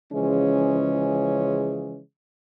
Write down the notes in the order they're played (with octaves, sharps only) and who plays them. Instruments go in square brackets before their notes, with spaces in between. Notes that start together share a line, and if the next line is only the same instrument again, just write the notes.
[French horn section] C#3 E3 F3 G#3 C#4 G#4